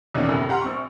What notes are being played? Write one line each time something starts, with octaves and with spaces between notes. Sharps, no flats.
E2 B2 D#3 A#3 C#4 D4
F#1 F#2 A2 C3
G4 F#5 A#5 C6 F6
A#1 C4 C#6